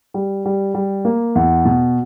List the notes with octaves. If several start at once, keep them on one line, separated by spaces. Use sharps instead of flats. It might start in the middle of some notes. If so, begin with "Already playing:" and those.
G3
G3
G3
A#3
E2
B2